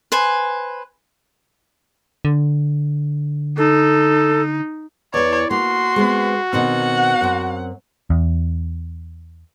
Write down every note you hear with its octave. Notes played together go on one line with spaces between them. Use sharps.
B4 C5 G#5
D3
D#4 A4
E2 E3 C#5 D5
A#3 F#4 C6
G#3 B3 C4
B2 D#3 C4 F#5
F#2 C4
E2